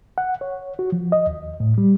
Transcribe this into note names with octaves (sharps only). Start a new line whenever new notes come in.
F#5
C#5
F#4
F3
D#5
D#2
A2
G3